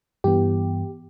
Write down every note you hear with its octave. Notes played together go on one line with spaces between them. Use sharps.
G2 E3 B3 G4